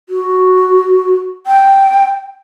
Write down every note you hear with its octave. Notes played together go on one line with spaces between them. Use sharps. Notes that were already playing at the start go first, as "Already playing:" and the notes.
F#4
G5